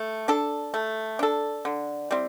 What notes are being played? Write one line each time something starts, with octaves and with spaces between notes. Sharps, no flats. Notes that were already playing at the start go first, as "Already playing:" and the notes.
Already playing: A3
D4 A4
A3
D4 A4
D3
G3 C4 E4